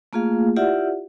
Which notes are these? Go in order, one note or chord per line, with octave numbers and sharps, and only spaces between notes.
A3 A#3 F4 G#4 F5
E4 F4 G4 D5 E5 F#5